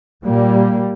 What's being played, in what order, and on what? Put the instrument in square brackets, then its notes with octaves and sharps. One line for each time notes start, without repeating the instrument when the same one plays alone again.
[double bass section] A#2 G3 A#3